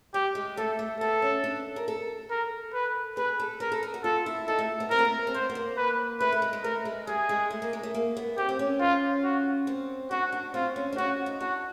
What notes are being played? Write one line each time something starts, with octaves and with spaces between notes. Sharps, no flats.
G3 G4
G#3
A3 A4
A3
B3 A4
C#4
D4
A#4
A4
A#4
B4
G#4 B4
A4
A#4 B4
A4
G#4
F#4
F4 A4
E4
D#4 A4
A3
B3
C4 A#4
A#3
B3
C4
B3 C5
B3
A#3
B4
A3 B4
A3
G#3
G#3
A3 A#4
G#3
G3 G#4
G#3
A3
A#3
G#3
A3
A#3
B3
C4 G4
C4
C#4
F4
F#4
C4
D4 F#4
D4
C4 F4
C#4
D4
C#4 F#4
D#4
D4 F#4